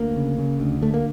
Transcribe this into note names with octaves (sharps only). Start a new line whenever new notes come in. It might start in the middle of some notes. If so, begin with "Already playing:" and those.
Already playing: D2 A#3
C#3
C#3
D2
D3 A3
A#3